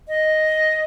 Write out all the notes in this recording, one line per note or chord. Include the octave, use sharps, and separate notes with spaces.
D#5